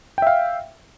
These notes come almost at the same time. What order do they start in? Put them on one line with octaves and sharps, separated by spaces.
G5 E5 F5